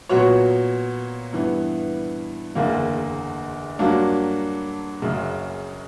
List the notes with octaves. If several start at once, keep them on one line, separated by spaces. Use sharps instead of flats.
A#2 F#3 B3 F#4 C#5
G2 E3 B3
F#1 E2 D3 A#3
G2 F#3 A#3 D4
F#1 F#2 C#3